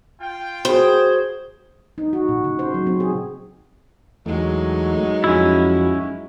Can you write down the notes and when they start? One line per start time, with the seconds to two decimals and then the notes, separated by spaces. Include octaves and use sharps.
0.21 F4 G5
0.65 F#4 G#4 C5
1.98 D#4
2.13 F#4
2.29 A#2
2.44 C#3
2.59 C5
2.74 F#3
2.87 C4
3.00 G#4
4.26 E2 F#3 G#3 A3 D#4
5.24 F2 C#4 E4 F#4